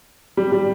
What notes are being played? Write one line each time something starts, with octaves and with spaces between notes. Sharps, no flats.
G3
G3